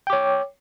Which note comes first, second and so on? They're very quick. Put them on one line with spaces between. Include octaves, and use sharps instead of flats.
G5 D6 C#5